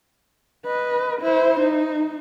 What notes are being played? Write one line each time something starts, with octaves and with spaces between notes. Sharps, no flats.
B4 D#5
E4 C5
D#4